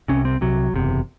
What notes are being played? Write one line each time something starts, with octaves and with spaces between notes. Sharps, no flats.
C2 C3 C#4
C4
C2 C3 F#3
F#1 E2 C3